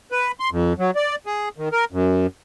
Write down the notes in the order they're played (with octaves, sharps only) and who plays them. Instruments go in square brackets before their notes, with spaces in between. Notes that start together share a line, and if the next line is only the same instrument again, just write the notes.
[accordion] B4
C6
F2
F#3
D5
G#4
D#3
A#4
F#2